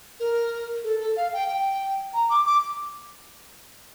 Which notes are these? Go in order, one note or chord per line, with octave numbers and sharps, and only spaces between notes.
A#4
A4
A4
F5
G5
G5
A#5
D6
D6